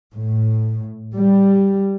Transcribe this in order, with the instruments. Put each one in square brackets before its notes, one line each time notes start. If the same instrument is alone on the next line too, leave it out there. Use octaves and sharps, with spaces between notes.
[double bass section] A2
G3